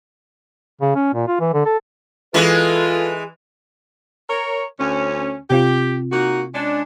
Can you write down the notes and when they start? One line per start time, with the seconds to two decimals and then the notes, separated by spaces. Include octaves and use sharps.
0.81 C#3
0.95 C#4
1.14 A#2
1.28 F4
1.40 E3
1.53 D3
1.66 A4
2.34 E3 G#3 F4 A4 B4
4.30 A#4 C#5
4.79 D2 C#4
5.50 C3 C4 F4 G4
6.12 A#3 D#4 F#4
6.54 G#3 C#4 D4